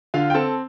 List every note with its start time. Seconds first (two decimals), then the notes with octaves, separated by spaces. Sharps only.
0.14 D3 F4 F5
0.30 G5
0.34 C4 A4 A5